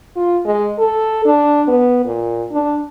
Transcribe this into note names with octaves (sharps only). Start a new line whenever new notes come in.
F4
G#3
A4
D4
B3
A#2
D4